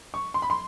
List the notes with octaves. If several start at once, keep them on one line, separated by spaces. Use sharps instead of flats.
C#6
C6
B5
C6